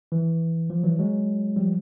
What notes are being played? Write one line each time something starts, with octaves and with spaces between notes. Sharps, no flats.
E3
F3
E3 F#3
F#3 G#3
F3 G3